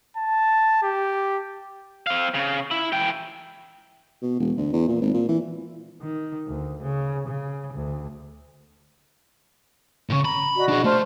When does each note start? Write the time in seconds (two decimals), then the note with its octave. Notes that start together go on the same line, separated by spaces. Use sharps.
0.17 A5
0.82 G4
2.07 C4 F5
2.34 C#3
2.71 E4
2.92 E3 G5
4.22 B2
4.39 E1
4.57 D2
4.73 E2
4.88 A#2
5.02 G#1
5.14 A#2
5.28 E3
6.01 D#3
6.47 D2
6.83 C#3
7.27 C#3
7.74 D2
10.09 A2 C#3 C#6
10.25 A#5 B5
10.56 F#4 D5 D#5
10.69 D4 G#4
10.84 A3 C5 A5 F6